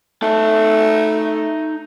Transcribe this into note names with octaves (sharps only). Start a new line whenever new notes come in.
A3 D#4 A5